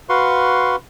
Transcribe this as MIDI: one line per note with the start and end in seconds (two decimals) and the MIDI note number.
0.09 0.76 66
0.09 0.76 71
0.09 0.76 77
0.09 0.76 84
0.09 0.76 85